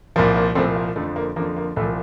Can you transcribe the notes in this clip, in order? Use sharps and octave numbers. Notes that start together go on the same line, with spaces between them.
C2 A#2 F3 A#3
A#3
C2 A#2 F3 A3 C4
A#3
F2 D3 F3 A3
A#3
F2 D3 F3 A#3
A#3
C2 A#2 F3 A3